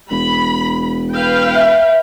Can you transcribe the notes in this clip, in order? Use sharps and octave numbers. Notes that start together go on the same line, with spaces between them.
E1 B5
B4 F5 G5
E5